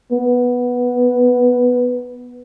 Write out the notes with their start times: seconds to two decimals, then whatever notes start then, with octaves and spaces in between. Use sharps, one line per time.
0.12 B3